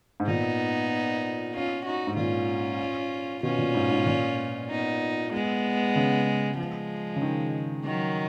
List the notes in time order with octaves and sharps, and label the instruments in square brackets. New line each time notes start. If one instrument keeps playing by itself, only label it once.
[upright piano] G#2
[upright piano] A#2 [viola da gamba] B3 D#4
[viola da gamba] C#4 F4
D#4 F#4
[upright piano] G#2
[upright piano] A#2 [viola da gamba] C#4 F4
[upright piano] B2 [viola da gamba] C#4 F4
[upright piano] A#2
G#2
G#2
A#2
[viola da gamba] B3 D#4
G#3 B3
[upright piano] C#3
[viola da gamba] F3 G#3
[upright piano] C#3
D#3
[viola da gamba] D#3 F#3